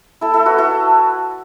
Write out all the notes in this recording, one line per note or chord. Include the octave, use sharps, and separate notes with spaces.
E4 A4
E4 A4
F#4 B4
E4 A4